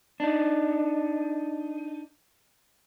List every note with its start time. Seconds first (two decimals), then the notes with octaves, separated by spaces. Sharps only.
0.20 D4 D#4